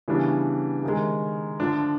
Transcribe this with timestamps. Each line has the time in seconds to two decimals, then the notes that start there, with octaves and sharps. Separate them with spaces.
0.08 C#3 E3 G3 B3 D4
0.83 C3 D#3 G#3
1.60 D3 F3 A3 D4